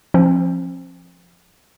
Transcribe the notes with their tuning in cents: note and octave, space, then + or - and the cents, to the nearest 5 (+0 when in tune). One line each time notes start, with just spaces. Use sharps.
F3 +0 C4 +40